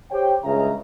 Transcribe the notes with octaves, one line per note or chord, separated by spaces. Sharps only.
G4 C5 C#5 G5
C#2 G2 C#3 G#3 E5 A#5